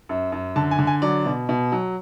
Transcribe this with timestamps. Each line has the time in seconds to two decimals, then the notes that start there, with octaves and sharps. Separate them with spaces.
0.09 F#2
0.32 F#2
0.56 D3 A5
0.71 G#5
0.79 D3
0.87 G#5
1.02 F#3 D5
1.26 B2
1.49 B2
1.72 F#3